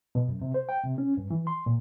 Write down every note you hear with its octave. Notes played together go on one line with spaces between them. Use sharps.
B2
F#2
C3
C5
G5
C3
C#4
G2
E3
C6
A#2